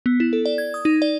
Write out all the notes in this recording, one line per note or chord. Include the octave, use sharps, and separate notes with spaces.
B3
E4
A4
D5
G#6
D#6
D#4
D5